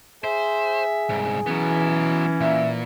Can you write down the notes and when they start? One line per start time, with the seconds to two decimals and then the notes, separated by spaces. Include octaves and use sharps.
0.24 G#4 C5 E5
1.09 C2 G#2
1.46 E3 F#3 B3 C#4
2.40 A#2 E5